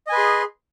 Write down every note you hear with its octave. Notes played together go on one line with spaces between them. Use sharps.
G#4 B4 D#5 G#5 C6